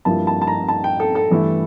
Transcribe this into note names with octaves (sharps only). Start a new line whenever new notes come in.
G2 F3 A#3 E4 A5
A5
A5
A#5
A5
G5
A4
A4
G2 E3 A3 E4